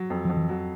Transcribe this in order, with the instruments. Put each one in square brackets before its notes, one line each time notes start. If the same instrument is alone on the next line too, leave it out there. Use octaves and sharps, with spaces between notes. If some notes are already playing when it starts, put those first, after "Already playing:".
Already playing: [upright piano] F#3
F2
[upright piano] F2 [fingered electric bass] F3
[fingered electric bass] E3
[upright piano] F#3